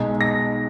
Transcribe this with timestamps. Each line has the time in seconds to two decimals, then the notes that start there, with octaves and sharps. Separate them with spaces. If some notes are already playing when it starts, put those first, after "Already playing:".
Already playing: B1 B2 G#3 D#4
0.21 A#6